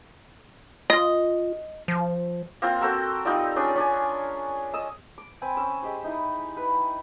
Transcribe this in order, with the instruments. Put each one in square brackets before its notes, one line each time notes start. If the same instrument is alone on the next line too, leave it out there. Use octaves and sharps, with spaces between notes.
[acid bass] F4 [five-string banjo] D#5
[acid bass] F3
[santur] A#3 C4 F4 C6
C4 F#4 A4 A#4
G3 D#4 F4 D5
C#4 D4 G#4
C#4 D4 G#5
D#5 E6
D6
C4 G#5 B5
C#4 C#5 E6
G#3 G4 C5
D#4 E4 D#6
B4 B5